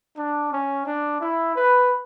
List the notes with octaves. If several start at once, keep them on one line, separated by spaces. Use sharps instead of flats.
D4
C#4
D4
E4
B4